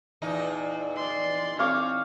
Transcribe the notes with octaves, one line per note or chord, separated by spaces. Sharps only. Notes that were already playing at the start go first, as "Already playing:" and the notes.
E2 A#2 D#4
D5 C6
C4 C#5 F5 D6